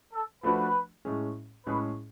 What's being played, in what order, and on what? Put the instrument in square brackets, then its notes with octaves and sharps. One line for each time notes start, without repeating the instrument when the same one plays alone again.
[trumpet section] A4
[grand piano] F3 A3 D4 F#4 [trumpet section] B4
[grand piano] A2 G#3 C#4 G#4
[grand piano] A2 G#3 C#4 G#4 [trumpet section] B4